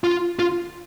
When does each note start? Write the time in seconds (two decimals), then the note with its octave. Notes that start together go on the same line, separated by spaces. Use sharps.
0.04 F4
0.39 F4